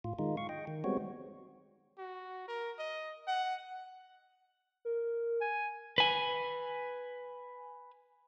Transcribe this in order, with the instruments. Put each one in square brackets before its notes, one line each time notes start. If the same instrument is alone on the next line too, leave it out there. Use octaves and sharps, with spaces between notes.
[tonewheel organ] A2 F4
D#3 G#3 D#4 F4
F5 C#6
D#5 G5
D#3
G3 G#3 B3 C4 F#4 C#5
[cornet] F#4
A#4
D#5
F#5
[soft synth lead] A#4
[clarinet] G#5
[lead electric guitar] B4 G#5